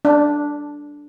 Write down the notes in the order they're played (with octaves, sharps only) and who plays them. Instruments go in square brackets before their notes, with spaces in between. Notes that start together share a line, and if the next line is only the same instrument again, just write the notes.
[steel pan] D4